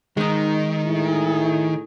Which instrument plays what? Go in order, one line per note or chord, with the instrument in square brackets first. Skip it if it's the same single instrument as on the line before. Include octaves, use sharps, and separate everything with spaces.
[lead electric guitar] D#3 [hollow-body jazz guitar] G#3 D#4
[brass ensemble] A2 E4 G#4